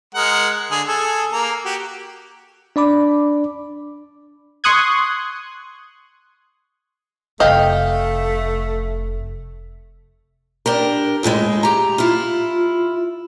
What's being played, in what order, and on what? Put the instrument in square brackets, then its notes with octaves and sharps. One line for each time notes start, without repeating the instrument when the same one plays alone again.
[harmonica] G#3 A#4 F#5
D3 G#4
G#4 A4
A#3 A#5
F#4 G4
[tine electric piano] D4 D5 B5 D6
[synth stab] C6 C#6 D#6 F#6 G#6
[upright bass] F1 C3 [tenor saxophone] A3 [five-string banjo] D#5 [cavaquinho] F5 G5
[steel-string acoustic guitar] D4 G4 A#4
D#2 A2 D3 G#3
G4 A#5
E4 F4